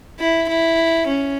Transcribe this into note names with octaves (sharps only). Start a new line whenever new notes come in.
E4
E4
C#4